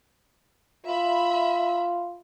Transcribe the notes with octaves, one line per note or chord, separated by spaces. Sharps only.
F4 E5 B5